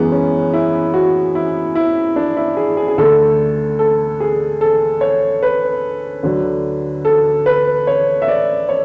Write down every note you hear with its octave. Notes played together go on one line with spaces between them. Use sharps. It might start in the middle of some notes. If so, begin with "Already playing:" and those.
Already playing: F#2 E3 G#3 B3
C#4
E4
F#4
E4
E4
D4
E4
G#4
G#4
G#4
D2 D3 A3 A4
A4
G#4
A4
C#5
B4
D2 D3 F#3
A4
B4
C#5
E5
D5
C#5